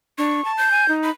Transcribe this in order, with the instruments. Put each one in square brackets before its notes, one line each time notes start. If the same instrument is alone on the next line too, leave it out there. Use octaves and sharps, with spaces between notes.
[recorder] D4 [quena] C#6
[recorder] A5
[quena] G6
[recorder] G#5
D#4
[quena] B5